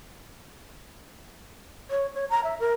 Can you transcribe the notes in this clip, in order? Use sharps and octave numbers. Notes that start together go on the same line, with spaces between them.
C#5
C#5
A#5
E5
A#4